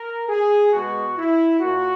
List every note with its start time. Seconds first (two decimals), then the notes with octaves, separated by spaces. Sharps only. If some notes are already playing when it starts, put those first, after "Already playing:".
Already playing: A#4
0.28 G#4
0.72 B2 G#3 B3 F#4
1.16 E4
1.60 A#2 A#3 F#4